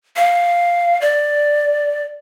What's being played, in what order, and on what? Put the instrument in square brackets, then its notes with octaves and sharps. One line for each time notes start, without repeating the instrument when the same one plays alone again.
[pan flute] F5
D5